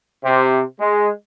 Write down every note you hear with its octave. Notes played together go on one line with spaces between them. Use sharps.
C3
G#3